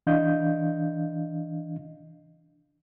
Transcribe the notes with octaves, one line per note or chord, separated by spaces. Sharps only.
E3 D4 D#5 F5 G6